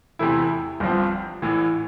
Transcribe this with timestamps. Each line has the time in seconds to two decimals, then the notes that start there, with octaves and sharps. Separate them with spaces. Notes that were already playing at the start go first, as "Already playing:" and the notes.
0.19 E2 C3 E3 A3 E4
0.80 G1 G2 F3 C4
1.42 A1 A2 E3